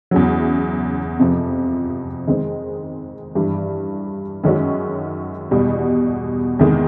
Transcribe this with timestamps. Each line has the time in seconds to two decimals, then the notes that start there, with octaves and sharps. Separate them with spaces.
0.11 E2 C#3 F#3
1.19 F2 C3 F3
2.27 D#3 G#3 C4
3.35 G2 E3 G3
4.43 F#2 D#3 G#3 C#4 F#4
5.51 E2 B2 G3
6.59 E2 C3 D#3 G#3